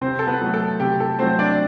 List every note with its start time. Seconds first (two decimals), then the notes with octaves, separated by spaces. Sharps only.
0.01 C3 C4 C5
0.19 A4
0.27 B3 B4
0.41 F#3 A3
0.54 A4
0.80 C3 G4
1.00 A4
1.19 F#3 A3 C4 C5
1.39 D4 D5